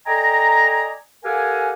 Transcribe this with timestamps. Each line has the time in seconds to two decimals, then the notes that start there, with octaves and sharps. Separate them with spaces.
0.06 A4 D5 D#5 G5 G#5 A#5
1.24 G4 A4 A#4 F5 F#5 G#5